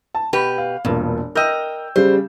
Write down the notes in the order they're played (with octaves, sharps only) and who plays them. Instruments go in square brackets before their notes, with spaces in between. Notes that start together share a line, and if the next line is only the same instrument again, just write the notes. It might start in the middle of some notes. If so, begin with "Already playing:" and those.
[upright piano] A5
[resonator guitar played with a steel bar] B2 G4 B4 [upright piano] B5
[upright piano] F5
[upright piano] E1 A#2 [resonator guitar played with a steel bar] G2
[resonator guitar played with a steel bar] A#4 D#5 [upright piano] G5 E6 G6
[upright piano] C#3 G3 [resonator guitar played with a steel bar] C5